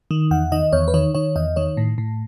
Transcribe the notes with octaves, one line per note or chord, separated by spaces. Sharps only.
D#3
E2 F#5
D#3 D#5
E2 C#5
B4
D#3 C#5
D#3 C#5
E2 D#5
D#3 C#5
A2
A2